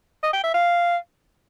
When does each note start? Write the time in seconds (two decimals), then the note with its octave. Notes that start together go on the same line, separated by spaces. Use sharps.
0.23 D#5
0.33 G5
0.44 E5
0.54 F5